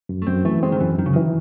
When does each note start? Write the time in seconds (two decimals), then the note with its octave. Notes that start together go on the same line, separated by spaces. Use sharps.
0.09 F#2
0.22 A3
0.27 F#2 C4
0.45 E3 A3
0.63 G#3 C4
0.72 D#3
0.80 F#2 E3
0.98 F#2 D#3
1.06 C#3
1.13 D#3 E3